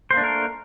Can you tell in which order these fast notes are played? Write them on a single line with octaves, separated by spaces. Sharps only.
C5 A#3 D4 A3 A#4